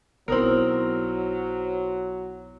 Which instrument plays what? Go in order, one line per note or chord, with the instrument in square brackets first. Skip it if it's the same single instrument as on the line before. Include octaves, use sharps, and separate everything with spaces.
[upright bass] B1 [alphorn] F#3 [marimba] B3 D#4 E4 [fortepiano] C4 A#4